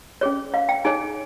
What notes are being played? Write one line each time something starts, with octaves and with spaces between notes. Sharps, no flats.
C#4 G#4 C#5
F5
G5
D#4 G#4 C#5 G#5